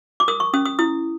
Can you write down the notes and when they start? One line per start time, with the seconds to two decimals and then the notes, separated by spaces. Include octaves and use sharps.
0.20 D6
0.28 A#4 D#6
0.40 C#6
0.53 C#4 D#6
0.65 D#6
0.79 E4 D#6